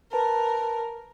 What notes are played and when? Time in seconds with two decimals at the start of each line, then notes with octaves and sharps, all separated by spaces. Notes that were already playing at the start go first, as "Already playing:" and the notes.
0.13 A#4 B4 A5